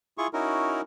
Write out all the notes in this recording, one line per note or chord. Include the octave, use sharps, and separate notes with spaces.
E4 F4 G#4 C#6
C#4 D#4 E4 F#4 A#4